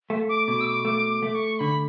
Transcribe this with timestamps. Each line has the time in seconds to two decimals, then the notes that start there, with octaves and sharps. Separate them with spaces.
0.10 A3
0.29 D6
0.47 B2 D6
0.61 E6
0.67 D6
0.85 A3 D6
1.10 D6
1.23 A3
1.35 C#6
1.59 D3 B5